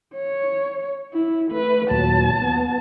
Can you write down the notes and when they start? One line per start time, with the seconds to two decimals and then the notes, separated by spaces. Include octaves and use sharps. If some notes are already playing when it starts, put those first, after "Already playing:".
0.15 C#5
1.13 E4
1.51 A3 B4
1.90 D#2 A#2 F#3 A5
2.42 B3